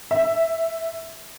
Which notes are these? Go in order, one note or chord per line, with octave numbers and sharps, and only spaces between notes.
E5